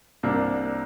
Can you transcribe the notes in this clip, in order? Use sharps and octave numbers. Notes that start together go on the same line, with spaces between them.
C2 C3 A#3 D4